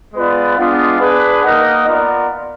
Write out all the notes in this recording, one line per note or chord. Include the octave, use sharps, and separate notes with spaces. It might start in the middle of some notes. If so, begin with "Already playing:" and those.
G#3 B3 F4 B4 D5
G#3 B3 D4 F4
D4 G#4 B4
A#3 D#4 A#4 D#5 F#5
B3 F4 A#4 D5 F#5